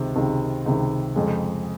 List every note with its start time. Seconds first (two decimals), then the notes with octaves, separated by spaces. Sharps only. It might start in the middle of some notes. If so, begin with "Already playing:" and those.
Already playing: C#2 C3 D#3
0.15 C#2 C3 D#3
0.66 C#2 C3 D#3
1.16 F2 C#3 G#3